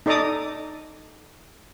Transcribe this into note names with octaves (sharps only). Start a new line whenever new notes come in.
D#4 A4 D5 A#5 D6 D#6